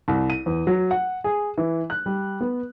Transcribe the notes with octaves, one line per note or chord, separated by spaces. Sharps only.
C2
D#7
E2
F#3
F#5
G#4
E3
F#6
G3
B3